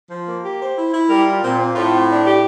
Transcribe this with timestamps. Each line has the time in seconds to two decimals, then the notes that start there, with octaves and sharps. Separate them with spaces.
0.10 F3
0.27 A#3
0.43 G4
0.60 C5
0.76 E4
0.93 E4
1.09 G3 A#4
1.26 F4
1.42 A#2 C4
1.59 C4
1.75 A2 F4
1.92 C4
2.08 D4
2.25 G4